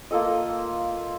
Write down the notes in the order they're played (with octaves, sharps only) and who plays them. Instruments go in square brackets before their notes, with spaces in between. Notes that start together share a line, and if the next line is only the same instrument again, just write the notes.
[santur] A#3 F4 A4 D#5